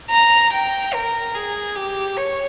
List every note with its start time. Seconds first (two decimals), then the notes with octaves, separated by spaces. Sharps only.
0.10 A#5
0.53 G5
0.93 A#4
1.34 G#4
1.76 G4
2.17 C#5